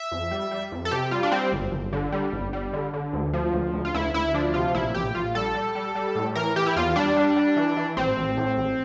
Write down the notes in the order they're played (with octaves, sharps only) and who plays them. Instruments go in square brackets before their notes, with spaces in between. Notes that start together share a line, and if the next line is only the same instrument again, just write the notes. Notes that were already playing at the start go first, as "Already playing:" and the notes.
Already playing: [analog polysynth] E5
F2
G3
G3
F2
A4
C3 G4
G3 F4
D4
G3 C4
G1
G1
D3
G3
G1
G3
D3
D3
D2
F3
D2
D2
F4
D2 E4
D2 E4
F3 D4
C3 F4
A#1 E4
A#1 G4
A#1 F4
G3 A4
G3
G3
G3
A2
E3 A#4
E3 G4
E4
E2 F4
G3 D4
G3
G3
E3
E3
A1 C4
A1
A2
A1